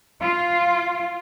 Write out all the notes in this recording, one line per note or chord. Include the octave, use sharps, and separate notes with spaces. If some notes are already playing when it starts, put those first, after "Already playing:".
F4